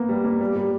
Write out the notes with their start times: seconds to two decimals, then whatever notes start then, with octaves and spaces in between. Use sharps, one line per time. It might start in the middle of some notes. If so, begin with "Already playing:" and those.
Already playing: A#3 B3
0.09 G3
0.24 A#3
0.41 G3
0.56 G3